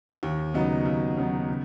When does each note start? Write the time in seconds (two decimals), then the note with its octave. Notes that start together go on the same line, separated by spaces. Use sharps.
0.23 D#2
0.54 C#3 F#3 B3 D#4
0.86 D#2
1.17 C#3 F#3 B3 D#4
1.48 C#3